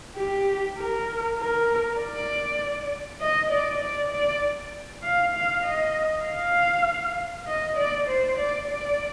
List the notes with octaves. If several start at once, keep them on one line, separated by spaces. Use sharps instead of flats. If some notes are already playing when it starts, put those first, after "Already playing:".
G4
A#4
A#4
D5
D#5
D5
D5
D5
F5
F5
D#5
F5
D#5
D5
C5
D5
D5